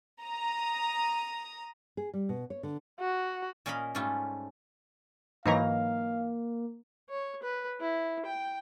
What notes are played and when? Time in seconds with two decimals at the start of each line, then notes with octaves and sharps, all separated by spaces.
0.22 A#5 D#6
1.97 G#4
2.14 G3
2.29 B2
2.50 C#5
2.63 D3
3.00 F#4
3.66 A#2 C#4 A#4 D#5 F5 B5
3.95 G#2 G3 A3 C#4 F4
5.46 G#2 E3 F#3 A#3 D#4 F5 A#5
7.10 C#5
7.42 B4
7.80 E4
8.25 G5